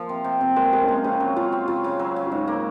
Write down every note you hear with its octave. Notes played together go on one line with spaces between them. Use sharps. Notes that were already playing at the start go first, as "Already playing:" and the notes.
Already playing: F3 A#3
C3
C3
C3 C4
G#3 A#3
G#3 A#3
C#4
C3 C4
C#3 C#4
F#3
C#3 F4
C4
C#3 F4
C#3
F#3
C#3
F4
G#2 D#4
A#3